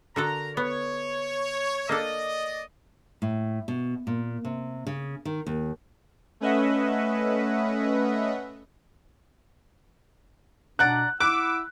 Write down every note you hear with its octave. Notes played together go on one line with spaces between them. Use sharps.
D3 F#4 A4 A#4 A#5
B3 C#5
A#3 D4 A4 D5 D#5
A2
B2
A#2
C3
C#3
D#3
D#2
A3 C#4 B4 D#5 E5 F#5
B2 D4 D5 F#5 A#5 F#6
E4 F#5 B5 D6 E6 F#6